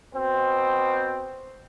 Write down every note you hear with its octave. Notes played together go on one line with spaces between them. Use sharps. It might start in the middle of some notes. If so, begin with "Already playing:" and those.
B2 C4